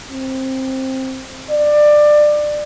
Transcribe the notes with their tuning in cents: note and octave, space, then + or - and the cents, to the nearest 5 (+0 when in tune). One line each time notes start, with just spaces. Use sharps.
C4 +10
D5 +20